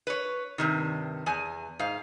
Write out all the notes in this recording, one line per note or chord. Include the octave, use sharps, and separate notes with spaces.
B4 C#5
G2 C3 D#3
E2 G#5
G#2 F5